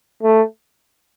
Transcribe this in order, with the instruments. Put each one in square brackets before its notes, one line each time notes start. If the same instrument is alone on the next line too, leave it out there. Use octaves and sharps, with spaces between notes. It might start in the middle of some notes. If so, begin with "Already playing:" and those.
[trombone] A3